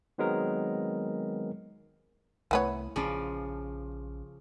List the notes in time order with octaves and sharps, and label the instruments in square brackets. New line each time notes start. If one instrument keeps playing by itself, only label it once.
[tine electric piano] D#3 F#3 G#3 B3 C4 A#4
[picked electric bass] C2 A3 [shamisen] E3 B3 C#5
[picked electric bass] A#1 C#4 [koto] C#3 F3 D5